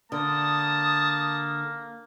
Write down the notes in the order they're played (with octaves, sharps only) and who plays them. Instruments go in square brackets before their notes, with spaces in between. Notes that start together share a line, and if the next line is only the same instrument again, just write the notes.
[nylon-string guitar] D3 [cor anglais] A#3 [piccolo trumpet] A5 [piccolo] D#6